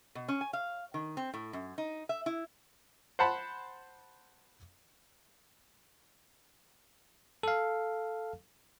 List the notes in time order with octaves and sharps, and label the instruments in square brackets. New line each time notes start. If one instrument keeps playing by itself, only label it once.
[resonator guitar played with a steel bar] B2
C#4
G#5
F5
D#3
C4
A2
F#2
D#4
E5
E4
[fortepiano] C5 F#5 A5 B5
[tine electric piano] A4 F5